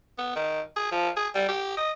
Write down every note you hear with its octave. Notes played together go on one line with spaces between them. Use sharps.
B3
D#3
G#4
F3
G#4
G3
G4
D#5